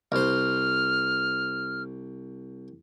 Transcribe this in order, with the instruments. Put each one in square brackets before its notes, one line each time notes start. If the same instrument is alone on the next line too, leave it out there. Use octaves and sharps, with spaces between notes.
[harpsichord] C2 C5 [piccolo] F6